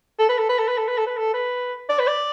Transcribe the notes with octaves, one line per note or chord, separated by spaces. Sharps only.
A4
B4
A4
B4
A4
B4
A4
B4
A4
B4
A4
B4
D5
B4
D5